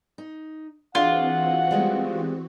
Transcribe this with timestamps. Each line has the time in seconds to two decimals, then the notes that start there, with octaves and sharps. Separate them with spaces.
0.18 D#4
0.95 E3 C4 D4 F4 F#4 G#4 D#5 F#5
1.71 G3 G#3 B3